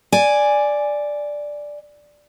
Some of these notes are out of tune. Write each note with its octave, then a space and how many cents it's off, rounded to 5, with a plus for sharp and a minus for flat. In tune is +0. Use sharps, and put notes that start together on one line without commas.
D5 +0 G#5 +0